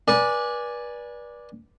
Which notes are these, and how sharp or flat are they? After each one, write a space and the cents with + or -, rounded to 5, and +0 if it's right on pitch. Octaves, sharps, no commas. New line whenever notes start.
B4 -35 D5 +0 G#5 +0